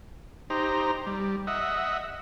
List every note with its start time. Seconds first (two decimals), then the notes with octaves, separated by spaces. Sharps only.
0.50 D#4 G4 C5 A#5
1.07 G3
1.47 D#5 E5 F#5